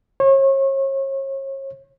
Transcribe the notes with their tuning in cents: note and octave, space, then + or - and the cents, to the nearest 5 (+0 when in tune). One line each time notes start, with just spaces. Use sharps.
C#5 -35